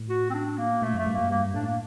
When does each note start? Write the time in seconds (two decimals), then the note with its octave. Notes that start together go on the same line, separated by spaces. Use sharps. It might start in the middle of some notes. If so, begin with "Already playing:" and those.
Already playing: A2
0.10 F#4
0.30 C4
0.34 D4
0.58 A#3
0.82 A#2 A3
0.94 F#2 A3
1.07 G2
1.15 F#2 A#3
1.30 G2 A#3
1.54 A2 D4
1.67 A#3